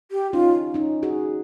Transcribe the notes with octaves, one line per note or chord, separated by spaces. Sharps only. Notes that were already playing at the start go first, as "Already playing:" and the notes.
G4
C#4 D#4 F4
C#4 D#4
F#4 G#4